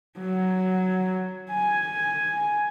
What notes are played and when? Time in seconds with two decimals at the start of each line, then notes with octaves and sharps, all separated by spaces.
0.17 F#3
1.51 G#5